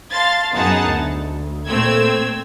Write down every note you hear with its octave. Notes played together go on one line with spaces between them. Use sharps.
F5 A5 C6 A6
F#2 B3 D#4 G#4 F#5 A5
D2
A#2 A3 C4 E6 G#6